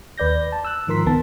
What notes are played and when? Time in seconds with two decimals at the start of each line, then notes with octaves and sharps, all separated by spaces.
0.18 D#2 B4 D5 G6 A#6
0.52 A5
0.65 E6 F#6
0.87 G#2 D#3 F3 A#4 C6 B6
1.06 C2 D#3 B3 A5